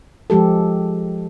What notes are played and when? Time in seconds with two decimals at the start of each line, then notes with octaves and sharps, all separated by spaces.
0.30 F3 G#3 G4 A4